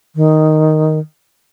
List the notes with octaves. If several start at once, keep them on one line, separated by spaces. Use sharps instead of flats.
D#3